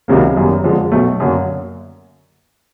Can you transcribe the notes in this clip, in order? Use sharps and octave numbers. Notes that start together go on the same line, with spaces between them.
C#2 C3 D#3 F#3 A#3
G1 F#2 D#3 G3
F2 D3 F3 G#3
B1 B2 F#3 A3
F#2 D3 F#3 A#3